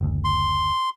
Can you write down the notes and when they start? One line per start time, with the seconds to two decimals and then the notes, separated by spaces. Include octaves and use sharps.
0.01 F#1 D2
0.25 C6